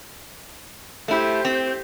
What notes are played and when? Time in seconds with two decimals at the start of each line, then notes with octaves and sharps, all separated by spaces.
1.08 A3 E4 G4 C5
1.45 C4